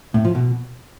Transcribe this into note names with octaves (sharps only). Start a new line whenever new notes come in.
A2
F3
B2